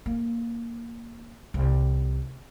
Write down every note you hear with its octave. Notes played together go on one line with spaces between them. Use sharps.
A#3
C2